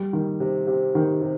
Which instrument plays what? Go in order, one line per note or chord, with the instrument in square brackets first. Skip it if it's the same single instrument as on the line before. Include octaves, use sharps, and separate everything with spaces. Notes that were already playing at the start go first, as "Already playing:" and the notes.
Already playing: [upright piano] G3
D#3
C3
C3
D#3
C3